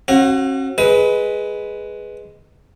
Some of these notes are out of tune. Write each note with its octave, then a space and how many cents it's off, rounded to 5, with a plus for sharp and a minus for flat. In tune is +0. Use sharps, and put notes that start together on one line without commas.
C#4 -45 F#4 +20 F5 +45
G#3 +0 B4 +0 D#6 +35